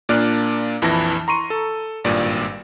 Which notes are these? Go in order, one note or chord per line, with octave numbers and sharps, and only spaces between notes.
A#2 A#3 D4 D5 F6 F#6
A#1 F2 E3 E4 A5 A#6
A#5 C6 C#6 D#7
A4
G#1 G2 A#2 D5